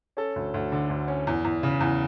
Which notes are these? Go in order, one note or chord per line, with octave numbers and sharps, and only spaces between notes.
C#4 A4
D2
D2
D3
D2
C#4
E2
E2
C#3
E2